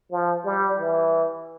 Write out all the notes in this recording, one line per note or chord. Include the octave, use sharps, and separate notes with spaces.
F3
G3
E3